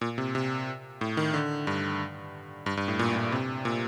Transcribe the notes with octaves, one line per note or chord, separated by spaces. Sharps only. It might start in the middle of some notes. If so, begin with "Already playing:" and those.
A#2
C3
C3
A2
D#3
D3
G2
G2
G2
A2
A#2
A#2
C3
A#2